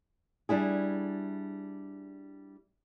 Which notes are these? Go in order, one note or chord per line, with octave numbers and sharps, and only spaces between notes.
G3 D4 E4 G#4